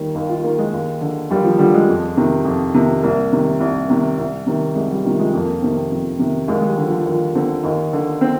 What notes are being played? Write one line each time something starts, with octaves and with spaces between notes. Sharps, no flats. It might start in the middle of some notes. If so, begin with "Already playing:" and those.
Already playing: D#2 D#3 G3 A#3
D#2 D#4
F4
D#3 A#3
G#3
D#2
D3
D#2 G3
F3
D3 G3
G#3
F2
C3 D#3
F2
C3 D#3
C2 A#3
C3 D#3
C2
C3 D#3
C2
C3 D#3
C2 G#3
G3
C3 D#3 F3
G#3
F2 A#3
C3 D#3 C4
F2
C3 D#3
D#2 G#3
G#3
G3
D3
F3
D#2 F3
D3 C4
D#2 D#4
D3
C4